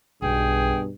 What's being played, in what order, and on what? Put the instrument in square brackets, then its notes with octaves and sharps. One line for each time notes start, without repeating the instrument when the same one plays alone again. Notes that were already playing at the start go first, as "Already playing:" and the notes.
[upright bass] B1 [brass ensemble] G2 B2 [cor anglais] G#4 [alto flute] G5